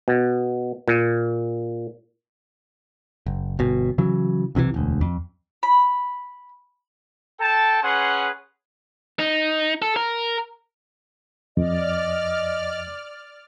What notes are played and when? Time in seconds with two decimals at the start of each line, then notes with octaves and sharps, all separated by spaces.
0.08 B2
0.88 A#2
3.26 F#1
3.59 G1 B2
3.98 C#3 E3 F#3
4.55 B1 C3 D#3 E3
4.74 E1 D2
5.01 F2
5.63 B5
7.40 A4 G5 A5
7.82 C#4 G#4 B4 F#5 C6
9.19 D#4
9.82 A4
9.96 A#4
11.57 F2 D5 D#5 F6